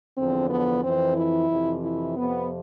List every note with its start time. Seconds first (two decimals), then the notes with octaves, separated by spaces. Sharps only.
0.17 E2 D3 F3 C4
0.50 B3
0.84 F2 E3 C4
1.17 E4
1.50 F2 C3 E3
1.84 E4
2.17 F2 C3 F3 B3